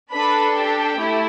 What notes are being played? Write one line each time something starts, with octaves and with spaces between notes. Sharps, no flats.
D4 A4 B4 B5
G4 G5
A3 E4